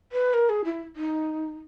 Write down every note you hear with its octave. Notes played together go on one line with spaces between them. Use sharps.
B4
A#4
G#4
E4
D#4